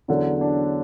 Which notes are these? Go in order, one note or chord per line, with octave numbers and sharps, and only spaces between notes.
E2 D3 F#3 C#4
D4